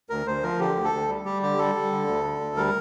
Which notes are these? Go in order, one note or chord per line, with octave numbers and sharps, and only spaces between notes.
D2 A#4
D2 C5
F3 A#4
D3 G4
D2
A4
D2
G3
G3 G4
D3 G4
G3 A4
G3
D3
D2
D3
D2
G3 A#4